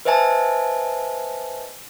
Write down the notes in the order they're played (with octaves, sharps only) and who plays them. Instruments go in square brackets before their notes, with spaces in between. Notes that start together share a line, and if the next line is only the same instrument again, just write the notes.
[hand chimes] B4 C5 D#5 E5 G#5 A5